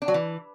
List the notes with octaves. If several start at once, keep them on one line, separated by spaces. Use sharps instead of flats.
D4
F#3
E3